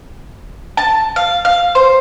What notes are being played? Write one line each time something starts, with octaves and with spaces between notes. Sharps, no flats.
A5
F5
F5
C5